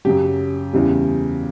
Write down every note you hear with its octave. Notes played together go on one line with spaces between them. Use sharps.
F#2 C#3 F#3 G4
E2 C#3 G3